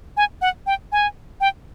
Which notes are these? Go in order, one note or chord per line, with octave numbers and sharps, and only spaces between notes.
G#5
F#5
G5
G#5
G5